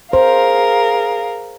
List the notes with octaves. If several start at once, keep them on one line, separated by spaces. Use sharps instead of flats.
G#4 A#4 C5 F5